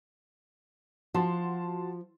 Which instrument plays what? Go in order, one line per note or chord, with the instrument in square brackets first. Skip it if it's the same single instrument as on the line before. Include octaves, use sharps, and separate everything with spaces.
[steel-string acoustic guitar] F3 [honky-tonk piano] F#4 A5 C6